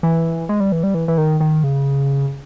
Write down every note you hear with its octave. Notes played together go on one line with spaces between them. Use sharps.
E3
G#3
G3
E3
G3
E3
E3
D#3
D#3
C#3